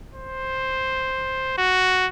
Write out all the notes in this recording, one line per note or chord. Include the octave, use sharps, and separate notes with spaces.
C5
F#4